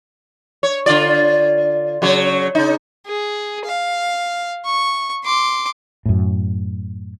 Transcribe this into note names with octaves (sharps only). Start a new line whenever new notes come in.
C#5
D3 F4 D5
C#3 F#3 C#5
C#3 D#4
G#4
F5
C#6
C6 D6
F#2 A2